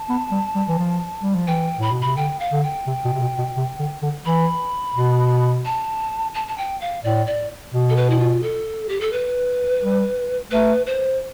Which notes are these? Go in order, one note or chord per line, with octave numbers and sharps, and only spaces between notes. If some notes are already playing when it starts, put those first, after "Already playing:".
Already playing: A5
B3
G3
G3
E3
F3
G3
F3
E3 G5
A2 B5
B2
C3 B5
D3 G5
F5
D3
G5
C3
B2
C3
B2
B2
C3
D3
D3
E3 B5
B2
A5
A5
A5
G5
F5
A2 D5
D5
B2
A4
B4
E4
F4
A4
G4
A4
B4
G3
A3 B4
C5